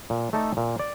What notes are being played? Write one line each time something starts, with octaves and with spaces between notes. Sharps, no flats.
A#2
A3 D#4 A4 D5
A#2
D5